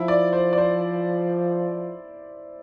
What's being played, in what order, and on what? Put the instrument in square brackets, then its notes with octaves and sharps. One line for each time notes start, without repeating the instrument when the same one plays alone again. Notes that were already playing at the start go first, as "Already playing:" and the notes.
Already playing: [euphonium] F3 [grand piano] E4
[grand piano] D5
C5
D5
C5